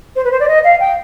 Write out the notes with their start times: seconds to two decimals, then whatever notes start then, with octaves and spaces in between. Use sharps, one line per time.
0.16 C5
0.24 B4
0.31 C5
0.40 D5
0.48 D#5
0.64 F5
0.80 G5